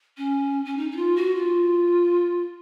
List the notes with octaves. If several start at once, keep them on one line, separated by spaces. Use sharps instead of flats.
C#4
C#4
D#4
D#4
F4
F#4
F4